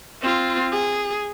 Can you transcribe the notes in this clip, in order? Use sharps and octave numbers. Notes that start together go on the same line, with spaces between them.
C4 F4
G#4